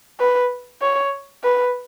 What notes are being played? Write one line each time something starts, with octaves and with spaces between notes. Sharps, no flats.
B4
C#5
B4